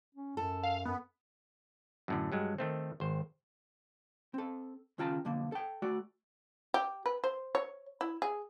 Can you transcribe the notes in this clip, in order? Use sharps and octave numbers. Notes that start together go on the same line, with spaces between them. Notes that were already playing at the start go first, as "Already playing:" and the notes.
C#4
F#2 A4
F5
F#2 B3
F#2 A2 D3
G2 F#3 G#3
D#3 A3 C4
G#1 C5
C4 A4
D#2 C#3 F4 G5 A5 A#5
B1 F2 D3 A#3
A4 G5
A3 F#4 D5
G4
B4
C5
C#5
E4
G#4